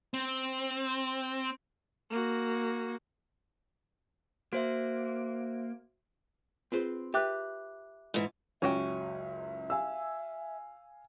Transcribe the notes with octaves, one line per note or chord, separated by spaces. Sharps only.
C4
A#3 F#4
A#3 F#4 C5 E5
C4 F4 G#4 B4 C5
G4 B4 E5 G5 D6 F#6
G#2 E3
F#1 C#2 C#4 F#4 E5 G5
F5 G#5 E6